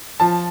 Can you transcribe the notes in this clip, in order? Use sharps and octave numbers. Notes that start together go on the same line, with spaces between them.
F3 A5